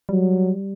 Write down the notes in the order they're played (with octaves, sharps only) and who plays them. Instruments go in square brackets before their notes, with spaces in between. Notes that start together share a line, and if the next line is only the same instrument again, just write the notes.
[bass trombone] F#3 [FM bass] G3